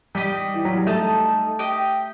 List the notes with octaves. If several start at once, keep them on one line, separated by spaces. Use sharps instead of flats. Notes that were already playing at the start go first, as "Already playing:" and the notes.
G3 D#4 G4 D#5
E3
F#3
G3
A3 D#4 A4 D#5 A5
G4 D#5 G5